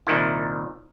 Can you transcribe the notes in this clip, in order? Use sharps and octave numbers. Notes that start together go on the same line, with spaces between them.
C2 A#2 D#3 E4